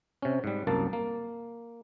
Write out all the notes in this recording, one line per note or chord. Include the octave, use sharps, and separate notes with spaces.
C3 C#4
G#2 G3
C2 F#2 A#3 A5
A#3